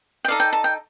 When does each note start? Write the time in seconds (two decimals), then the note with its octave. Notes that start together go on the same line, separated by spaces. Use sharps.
0.25 G5
0.28 D#4 A4 D5 F5
0.40 G5
0.53 A5
0.64 G5